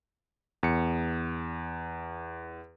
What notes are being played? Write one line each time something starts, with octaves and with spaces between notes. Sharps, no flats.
E2 C#7